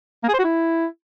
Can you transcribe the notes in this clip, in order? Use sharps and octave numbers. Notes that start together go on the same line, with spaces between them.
A#3
G#4
C5
F#4
E4